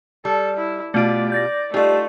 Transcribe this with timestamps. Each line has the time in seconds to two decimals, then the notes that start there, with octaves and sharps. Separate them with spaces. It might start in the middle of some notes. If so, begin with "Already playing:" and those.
0.25 G3 A4 A5
0.57 E4
0.94 B2 A3 F4 G4 D5 D7
1.32 D5 G6 A6 A#6
1.74 G3 A3 D#4 F4 G4 C#6